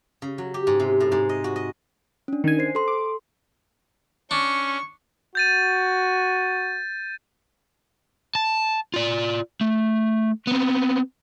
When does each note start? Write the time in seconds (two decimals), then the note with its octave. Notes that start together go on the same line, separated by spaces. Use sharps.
0.22 C#3
0.38 F#3
0.54 G4
0.67 G#2
0.80 C3
1.00 A2
1.12 G#2
1.29 D#5
1.44 F#4
1.56 D#5
2.28 C#4 D4
2.44 D#3 G#5
2.59 C5 C7
2.75 A4 C6
2.88 D6
4.31 C#4 D4 C#6
5.35 F#4 G6 A6 D#7
8.35 A5
8.94 F4 D5
9.61 A3
10.47 B3 C4